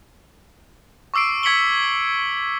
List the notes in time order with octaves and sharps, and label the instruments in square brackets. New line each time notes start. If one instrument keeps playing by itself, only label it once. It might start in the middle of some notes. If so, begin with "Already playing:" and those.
[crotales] C#6 D6 E6 C7 D7
C#6 G#6 B6 C#7 F#7 G7